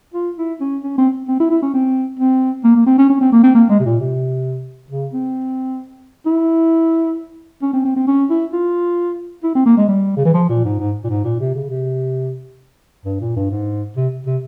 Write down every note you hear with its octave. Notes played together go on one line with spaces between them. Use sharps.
F4
E4
C#4
C#4
C4
C4
E4
E4
C#4
C4
C4
A#3
A#3
C4
C#4
C#4
C4
A#3
C4
A#3
G#3
C3
A#2
C3
C#3
C4
E4
C#4
C4
C4
C4
C#4
E4
F4
E4
C4
A#3
G#3
G3
C#3
E3
F3
A#2
G#2
G#2
A#2
G#2
A#2
C3
C#3
C3
G2
A#2
G2
G#2
C3
C3